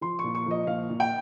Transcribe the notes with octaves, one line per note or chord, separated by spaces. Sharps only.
F3 C6
C#6
A#2
C#6
F3 D#5
A#2 F5
A#2
G5